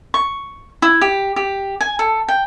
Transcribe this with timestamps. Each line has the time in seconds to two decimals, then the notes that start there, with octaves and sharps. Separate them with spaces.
0.14 C#6
0.82 E4
1.01 G4
1.36 G4
1.81 G#5
1.99 A4
2.29 G5